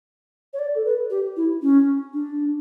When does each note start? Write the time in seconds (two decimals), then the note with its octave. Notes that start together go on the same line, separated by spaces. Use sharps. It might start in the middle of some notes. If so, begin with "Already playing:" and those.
0.53 C#5
0.58 D5
0.74 A4
0.84 B4
1.09 G4
1.36 E4
1.61 C#4
2.13 D4